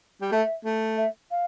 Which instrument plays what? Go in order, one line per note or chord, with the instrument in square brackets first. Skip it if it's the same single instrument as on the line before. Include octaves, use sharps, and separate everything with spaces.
[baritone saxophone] G3
[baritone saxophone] A3 [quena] E5
[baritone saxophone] A3
[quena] E5
F5